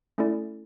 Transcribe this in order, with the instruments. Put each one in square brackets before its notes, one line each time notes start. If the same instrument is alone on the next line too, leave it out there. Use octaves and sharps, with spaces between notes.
[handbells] A3 C#4 E4 A4 D5